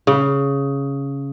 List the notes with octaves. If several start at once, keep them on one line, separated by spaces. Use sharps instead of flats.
C#3